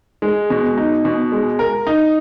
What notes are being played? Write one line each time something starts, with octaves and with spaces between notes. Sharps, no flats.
G#3
B2
D#4
B2
G#3
A#4
D#4